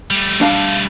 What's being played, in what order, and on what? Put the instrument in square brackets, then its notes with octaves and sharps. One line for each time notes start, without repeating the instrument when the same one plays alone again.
[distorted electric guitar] G3 A3
[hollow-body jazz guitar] D4 F5 A5